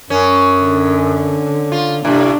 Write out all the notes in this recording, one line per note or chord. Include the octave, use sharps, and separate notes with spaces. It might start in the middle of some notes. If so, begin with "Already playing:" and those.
F#2 C#4
D3
F4
A2 C3 D4